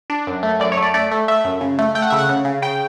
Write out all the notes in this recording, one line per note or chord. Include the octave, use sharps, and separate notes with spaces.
D4
F#2
A3
F#2 D5
C#5
A3
D5
A3 D5
A3
A3 E5
F#2
C#3
A3
A3 G5
F#5
C#3 E5
F#5
C#3
C#3
C#3 G5